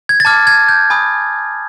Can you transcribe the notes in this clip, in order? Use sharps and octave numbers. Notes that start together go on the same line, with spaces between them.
G#6
A6
A5 D6 F6 G#6
G#6
G6
G#5 B5 D#6 G6